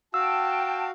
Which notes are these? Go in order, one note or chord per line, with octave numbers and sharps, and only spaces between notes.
F#4 F5 G5 A5 E6